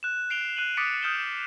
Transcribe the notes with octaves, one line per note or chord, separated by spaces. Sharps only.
F#6 E7
C7 D7 F7 G7
F#6 D#7 F#7
D6 D#6 A6 B6 C#7 D7
D#6 F6 G6 D7 E7 G7